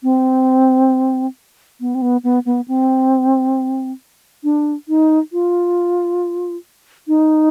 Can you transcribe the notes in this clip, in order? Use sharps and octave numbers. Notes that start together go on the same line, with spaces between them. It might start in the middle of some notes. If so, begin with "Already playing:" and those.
C4
B3
C4
B3
B3
B3
C4
D4
D#4
F4
D#4